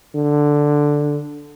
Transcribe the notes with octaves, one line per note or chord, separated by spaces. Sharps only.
D3